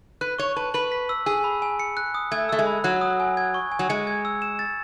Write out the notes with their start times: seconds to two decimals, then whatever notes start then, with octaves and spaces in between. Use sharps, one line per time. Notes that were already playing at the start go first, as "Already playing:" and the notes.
0.21 B4 F#6
0.39 C#5 C#6
0.56 B4 A5
0.74 B4 F#7
0.92 B6
1.09 E6
1.26 G#4 E6
1.44 B5
1.62 G#5
1.79 C#7
1.97 F#6
2.15 D#6
2.32 A3 G#6
2.49 A3 E6
2.59 G#3
2.67 B5
2.84 F#3 F#6
3.01 D#6
3.20 G#5
3.37 G#6
3.54 C#6
3.72 G#5
3.79 F#3
3.89 G#3 C#7
4.07 G#6
4.25 E6
4.42 E7
4.59 A6